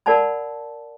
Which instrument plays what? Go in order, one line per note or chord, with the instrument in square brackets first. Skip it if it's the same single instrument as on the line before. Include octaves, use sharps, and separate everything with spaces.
[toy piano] A#4 D5 F#5 A5 B5